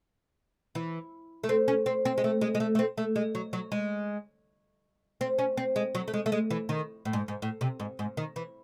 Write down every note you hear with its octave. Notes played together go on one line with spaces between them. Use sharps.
E3
A3
C4
C#4
C4
C4
G#3
A3
G#3
G#3
A3
A3
C4
A3
G#3
F#3
F#3
G#3
C4
C#4
C4
G#3
F#3
A3
G#3
A3
G#3
E3
D#3
A2
G#2
G#2
A2
C3
G#2
G#2
D#3
E3